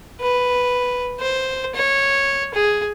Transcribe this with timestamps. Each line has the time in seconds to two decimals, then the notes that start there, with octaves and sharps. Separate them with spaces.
0.21 B4
1.20 C5
1.75 C#5
2.54 G#4